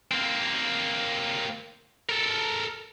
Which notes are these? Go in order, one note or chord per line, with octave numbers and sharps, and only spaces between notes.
A#3 C4
A4 A#4